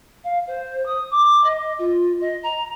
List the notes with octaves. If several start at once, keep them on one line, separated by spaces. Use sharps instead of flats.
F5
C5
D#6
D6
D#5
F4
D#5
A#5